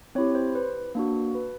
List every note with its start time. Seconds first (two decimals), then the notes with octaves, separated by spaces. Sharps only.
0.15 C4 E4 G4 C#5
0.35 C5
0.55 B4
0.95 A#3 D4 F#4
1.35 B4